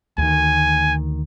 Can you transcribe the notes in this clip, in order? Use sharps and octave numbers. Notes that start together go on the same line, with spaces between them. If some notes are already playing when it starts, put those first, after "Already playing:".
D2 D#3 G#5